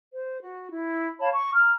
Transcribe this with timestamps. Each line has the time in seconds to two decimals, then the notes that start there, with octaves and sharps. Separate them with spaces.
0.13 C5
0.42 F#4
0.71 E4
1.20 C#5 F5 A5 B5
1.32 C#6
1.54 A#5 F6